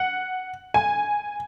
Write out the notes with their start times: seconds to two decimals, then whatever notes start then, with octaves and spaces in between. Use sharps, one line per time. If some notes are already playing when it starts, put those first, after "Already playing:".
Already playing: F#5
0.74 G#5